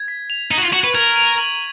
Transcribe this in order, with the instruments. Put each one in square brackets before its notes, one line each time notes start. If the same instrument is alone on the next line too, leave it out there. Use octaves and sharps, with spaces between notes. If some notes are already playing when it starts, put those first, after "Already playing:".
Already playing: [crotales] G#6
B6
F7
[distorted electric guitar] D#4 [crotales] F#7
[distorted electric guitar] F#4
F4
[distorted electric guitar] F#4 [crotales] C#6
[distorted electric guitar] B4
[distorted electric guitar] A#4 [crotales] G#6
[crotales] D#7
F#7